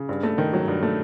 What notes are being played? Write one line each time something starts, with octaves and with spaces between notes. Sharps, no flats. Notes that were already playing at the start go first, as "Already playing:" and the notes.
Already playing: C#3
G2
A3
D#3
F#3
G2
A3